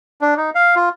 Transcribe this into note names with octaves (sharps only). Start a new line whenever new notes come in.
D4
D#4
F5
F4